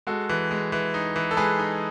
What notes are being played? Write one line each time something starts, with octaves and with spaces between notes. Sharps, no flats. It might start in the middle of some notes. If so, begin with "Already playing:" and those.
G#3 F#4 A4
E3
G#3
E3
D#4
E3
A4
G#3 G#4 B4
D#4